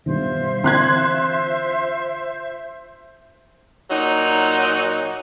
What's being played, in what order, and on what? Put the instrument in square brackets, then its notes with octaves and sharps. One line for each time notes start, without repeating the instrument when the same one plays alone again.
[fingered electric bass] G2 B2 D#3 [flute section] F4 C5 E5
[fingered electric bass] D3 E3 C4 [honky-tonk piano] C6 F#6 G#6
[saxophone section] A#2 F#3 D#4